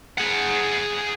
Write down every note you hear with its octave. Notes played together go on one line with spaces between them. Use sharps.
G#4 F#5